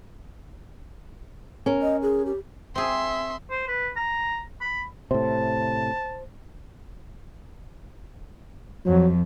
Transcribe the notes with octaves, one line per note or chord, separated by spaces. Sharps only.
C#4 A#4
D#5
G#4
G4
C4 G#4 E5 C6
C5
B4
A#5
B5
A2 C3 C5 A5
F2 F#3